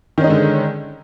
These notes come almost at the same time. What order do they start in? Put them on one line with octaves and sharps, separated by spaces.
D#3 C#4 D#4 G#3 D3